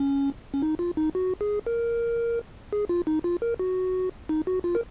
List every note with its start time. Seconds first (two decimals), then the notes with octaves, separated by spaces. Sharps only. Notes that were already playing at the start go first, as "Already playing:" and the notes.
Already playing: C#4
0.54 C#4
0.62 D#4
0.79 F4
0.97 D#4
1.15 F#4
1.41 G#4
1.66 A#4
2.73 G#4
2.89 F4
3.07 D#4
3.24 F4
3.42 A#4
3.59 F#4
4.29 D#4
4.47 F#4
4.64 F4
4.75 A#4